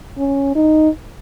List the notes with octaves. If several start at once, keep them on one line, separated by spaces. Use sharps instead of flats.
C#4
D#4